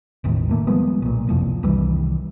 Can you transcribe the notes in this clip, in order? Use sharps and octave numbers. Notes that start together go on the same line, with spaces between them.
E1 A1 D#3
D#3 A3 A#3
F3 G3 G#3 B3
B1 A#2
F#1 C2 F2
C2 D#3 E3 G3